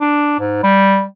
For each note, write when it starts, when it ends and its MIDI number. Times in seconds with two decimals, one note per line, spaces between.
0.01 0.36 62
0.39 0.61 44
0.63 1.03 55